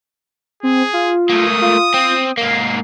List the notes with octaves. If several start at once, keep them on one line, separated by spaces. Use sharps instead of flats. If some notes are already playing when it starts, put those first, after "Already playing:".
C4 G#4
F4
A3 A#3 D#6
F4
C4
G#2 A#3 C7